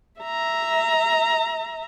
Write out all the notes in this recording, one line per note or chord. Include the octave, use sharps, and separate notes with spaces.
E5 A#5